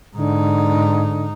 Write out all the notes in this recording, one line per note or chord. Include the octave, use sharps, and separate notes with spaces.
G#2 D3 D#4